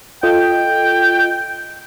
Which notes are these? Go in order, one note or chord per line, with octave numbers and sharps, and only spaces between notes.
F4 A4 D#5 G5